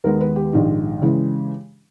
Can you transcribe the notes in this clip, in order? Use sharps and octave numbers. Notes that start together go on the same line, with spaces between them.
D#2 D#3 G#3 B3 A#4
B4
G4
A#1 G#2 D#3
C#3 E3 G#3